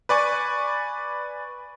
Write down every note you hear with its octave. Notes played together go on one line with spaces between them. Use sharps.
B4 D5 G#5 C#6